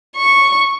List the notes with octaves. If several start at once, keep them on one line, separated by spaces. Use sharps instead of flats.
C#6